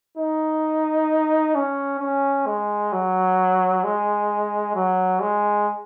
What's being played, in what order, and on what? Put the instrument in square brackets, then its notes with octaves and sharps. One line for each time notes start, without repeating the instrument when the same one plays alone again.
[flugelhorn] D#4
C#4
C#4
G#3
F#3
G#3
F#3
G#3